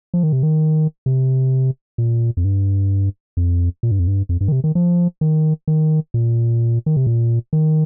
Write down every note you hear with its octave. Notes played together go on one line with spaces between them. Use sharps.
F3
D#3
C3
D#3
C3
A#2
F2
G2
F2
A#2
G2
F2
G2
F2
G2
D#3
C3
D#3
F3
D#3
D#3
A#2
D#3
C3
A#2
D#3